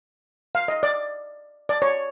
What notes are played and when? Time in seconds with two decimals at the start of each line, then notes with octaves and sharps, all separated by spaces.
0.55 F5
0.68 D#5
0.83 D5
1.69 D5
1.82 C#5